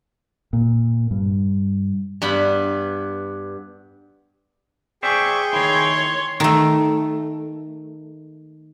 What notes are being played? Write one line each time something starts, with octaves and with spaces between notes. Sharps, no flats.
A#2
G2
G2 B3 B5
G#4 C5 D5 E5 G5 C#6
D#3 E4 C#5 C6
D#3 A3